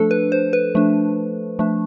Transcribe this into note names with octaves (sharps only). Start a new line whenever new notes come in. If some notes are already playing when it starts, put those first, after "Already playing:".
Already playing: F3 A3 D4 A4
B4
C5
B4
F3 A3 D4
F3 A3 D4